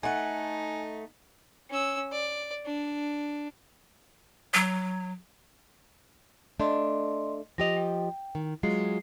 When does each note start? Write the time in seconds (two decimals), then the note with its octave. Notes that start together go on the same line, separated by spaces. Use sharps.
0.03 A3 D#4 F#5 G#5
1.70 C#4 E6
2.11 D5
2.65 D4
4.54 F#3
6.60 A3 D4 D5 D#5 C6
7.58 F3 G4 D#5 A#6 F7
7.77 G5
8.35 D#3
8.63 F#3 G#3 F4 C7